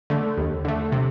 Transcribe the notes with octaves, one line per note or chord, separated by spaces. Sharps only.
D3 A3
D#2
D3 A3
C3